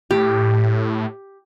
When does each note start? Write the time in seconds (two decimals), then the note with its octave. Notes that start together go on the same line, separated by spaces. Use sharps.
0.11 A2 G4